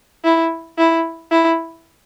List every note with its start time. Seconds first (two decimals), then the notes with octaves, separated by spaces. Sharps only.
0.24 E4
0.78 E4
1.31 E4